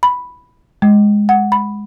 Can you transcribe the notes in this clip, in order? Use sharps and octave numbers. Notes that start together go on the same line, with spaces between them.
B5
G#3
F#5
B5